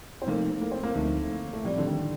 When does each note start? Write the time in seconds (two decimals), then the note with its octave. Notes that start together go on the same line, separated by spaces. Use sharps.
0.22 C4
0.27 C3 F3 A3 A#3 D#4 A4
0.61 A#3
0.71 C4
0.83 A#3
0.95 D2 D3 F3 A3 A#3 D#4
1.53 A3
1.64 A2 F3 G3 C4 G4 D5
1.78 D3
1.87 D#3